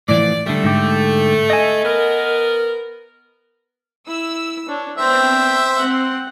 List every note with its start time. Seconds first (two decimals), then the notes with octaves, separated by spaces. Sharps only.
0.09 A2 E3 F3 D5
0.46 D3 G3 A3
0.63 G#2 D3 G4
1.50 D#5 G#5
1.85 B3 A#4
4.07 E4 E6
4.68 D4 C#5
4.98 B3 C4 D4 C5 E5 G5
5.79 C4 F#5 C6